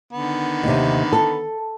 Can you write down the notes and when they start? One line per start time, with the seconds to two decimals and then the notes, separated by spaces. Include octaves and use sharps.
0.13 D3 D#3 B3
0.64 D#2 C3
1.13 A4